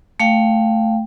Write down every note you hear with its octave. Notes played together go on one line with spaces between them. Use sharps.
A3 F5 G5